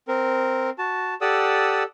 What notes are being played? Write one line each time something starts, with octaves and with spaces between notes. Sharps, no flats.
C4 A#4
F#4 A5
G4 A4 D5 F#5 D#6 E6